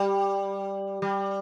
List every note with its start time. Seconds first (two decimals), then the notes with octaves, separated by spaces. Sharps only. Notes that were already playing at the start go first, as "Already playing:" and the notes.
Already playing: G3
1.02 G3